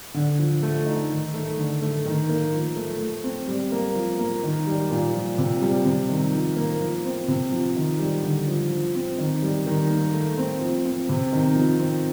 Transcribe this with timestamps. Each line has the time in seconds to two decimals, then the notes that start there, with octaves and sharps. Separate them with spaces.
0.14 D3
0.39 F3
0.63 A3
0.86 D#4
1.10 D#3
1.34 A3
1.58 D3
1.82 A3
2.05 D#3
2.29 A#3
2.53 F3
2.76 A3
3.00 A3
3.24 C4
3.48 G3
3.72 A#3
3.95 F3
4.19 A#3
4.43 D#3
4.67 G3
4.91 A#2
5.14 F3
5.38 C3
5.62 G3
5.85 C3
6.09 D#3
6.33 F3
6.56 A#3
6.81 F3
7.05 C4
7.28 C3
7.52 F3
7.76 D#3
7.99 G3
8.23 D3
8.47 F3
8.71 F3
8.95 C4
9.18 D#3
9.42 G3
9.67 D#3
9.90 A#3
10.13 A3
10.38 C4
10.61 F3
10.85 C4
11.09 C3
11.32 D#3
11.56 F3
11.80 C4